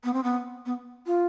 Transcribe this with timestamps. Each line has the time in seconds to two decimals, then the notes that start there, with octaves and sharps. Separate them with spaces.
0.04 B3
0.14 C4
0.24 B3
0.66 B3
1.06 F4